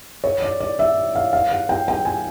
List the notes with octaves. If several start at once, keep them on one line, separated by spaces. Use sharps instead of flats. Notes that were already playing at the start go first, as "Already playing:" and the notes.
C#5
D5
D5
E5
F5
F5
F#5
G5
G5
G#5